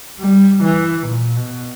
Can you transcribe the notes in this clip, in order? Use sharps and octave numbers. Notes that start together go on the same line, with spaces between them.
G3
E3
A#2
B2